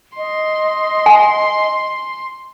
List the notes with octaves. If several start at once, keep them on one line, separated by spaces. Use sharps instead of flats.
D#5 C6
G#5